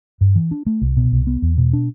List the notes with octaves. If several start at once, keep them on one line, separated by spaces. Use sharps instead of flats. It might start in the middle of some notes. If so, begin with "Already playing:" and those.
G2
E3
D4
A3
C2
B2
C2
B3
E2
B2
D4